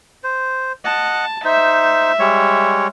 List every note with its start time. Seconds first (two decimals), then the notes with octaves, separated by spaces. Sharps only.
0.24 C5
0.85 D#5 F#5 A5
1.45 D#4 C5 E5
2.19 G3 G#3 C#5